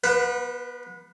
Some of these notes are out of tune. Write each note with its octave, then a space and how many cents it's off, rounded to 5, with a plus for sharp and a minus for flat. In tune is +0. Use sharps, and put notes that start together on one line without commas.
B3 -35 B4 +20